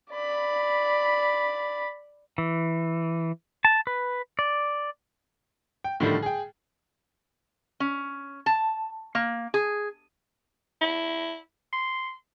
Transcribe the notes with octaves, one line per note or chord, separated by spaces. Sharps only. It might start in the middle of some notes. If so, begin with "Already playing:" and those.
D5 B5
E3
A5
B4
D5
G5
A2 D3 D#3 F3 G3 A3
G#4 G5
C#4
A5
A#3
G#4
E4
C6